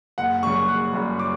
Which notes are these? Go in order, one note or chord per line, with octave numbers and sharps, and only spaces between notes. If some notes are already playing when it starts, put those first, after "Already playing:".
F#1 F#5
F#2 C#3 G3 C#6
F#1 F#6
F#2 C#3 G3
D6